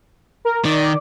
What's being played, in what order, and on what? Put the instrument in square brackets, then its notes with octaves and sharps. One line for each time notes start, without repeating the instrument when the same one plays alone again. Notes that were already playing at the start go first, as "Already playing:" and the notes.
[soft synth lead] A#4
[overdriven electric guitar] D#3 [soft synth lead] D5